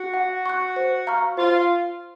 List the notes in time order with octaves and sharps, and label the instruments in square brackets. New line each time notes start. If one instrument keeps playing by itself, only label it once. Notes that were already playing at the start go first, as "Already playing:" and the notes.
Already playing: [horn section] F#4
[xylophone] F#5
C#6 F#6
C5
F5 A#5 C#6 F6
[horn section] F4 [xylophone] C5